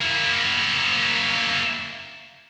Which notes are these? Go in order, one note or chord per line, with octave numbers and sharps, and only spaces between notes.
A#3 E4